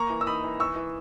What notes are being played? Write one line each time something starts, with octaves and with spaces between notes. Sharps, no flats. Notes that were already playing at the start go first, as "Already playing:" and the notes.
Already playing: A#3 A#5 C#6
E3
E6
D#4 B5 D#6
E3
E3 C#6 E6
E3